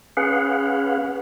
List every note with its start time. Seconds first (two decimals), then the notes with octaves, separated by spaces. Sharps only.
0.17 C#4 G#4 B4 F5 F#5